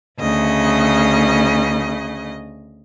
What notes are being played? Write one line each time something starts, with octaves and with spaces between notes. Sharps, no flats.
D2 C#3 D#5